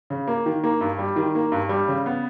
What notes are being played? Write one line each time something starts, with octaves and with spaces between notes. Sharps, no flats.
C#3
A#3
D#3
A#3
G2
G3
D#3
A#3
G2
G3
C#3
B3